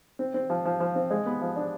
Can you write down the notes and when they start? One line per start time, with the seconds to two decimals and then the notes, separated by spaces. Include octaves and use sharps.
0.19 C4
0.34 C4
0.50 F3
0.65 F3
0.80 F3
0.95 C4
1.11 G#3
1.26 B3
1.41 F3
1.56 D4